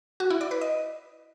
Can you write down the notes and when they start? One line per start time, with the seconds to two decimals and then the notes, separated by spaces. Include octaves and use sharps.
0.20 F#4
0.30 E4
0.41 D5
0.51 B4
0.61 D#5